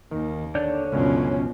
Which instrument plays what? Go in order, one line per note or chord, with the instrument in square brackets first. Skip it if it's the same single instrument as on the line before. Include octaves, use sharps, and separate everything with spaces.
[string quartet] D#2 [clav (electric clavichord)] D#3
[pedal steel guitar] D3 C#5 G6 [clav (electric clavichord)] D4 D5
[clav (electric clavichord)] C#2 F#2 [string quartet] B2 F3 [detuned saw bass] C#4